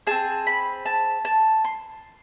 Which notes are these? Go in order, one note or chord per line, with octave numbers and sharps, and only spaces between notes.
C4 G#4 A5
B5
A5
A5
C6